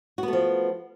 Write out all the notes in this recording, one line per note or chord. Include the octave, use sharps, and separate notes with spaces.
F3 A3 B3 F#4